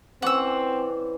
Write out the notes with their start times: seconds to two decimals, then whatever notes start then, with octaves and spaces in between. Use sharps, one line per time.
0.22 E3 C4 C#4 D5 F#5 E6